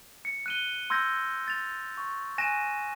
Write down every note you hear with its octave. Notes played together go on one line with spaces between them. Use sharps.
C#7
F#6 D#7 G7
C6 E6 G6 G#6 A#6
A6 F7
C#6
G#5 F#6 A#6 D#7 E7